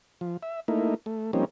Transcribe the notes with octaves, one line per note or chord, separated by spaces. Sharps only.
F3
E5
A3 A#3 D#4 E4
A3
F3 G3 A#3 C4 C#4 D#4